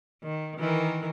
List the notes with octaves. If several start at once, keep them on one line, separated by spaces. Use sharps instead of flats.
D#3
D#3 E3 A#4